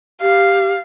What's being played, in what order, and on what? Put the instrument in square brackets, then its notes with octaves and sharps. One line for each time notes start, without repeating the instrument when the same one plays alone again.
[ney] G4 [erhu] F5